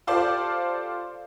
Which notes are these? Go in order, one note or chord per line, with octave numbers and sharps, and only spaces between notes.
F4 G4 A4 C5 D5 F5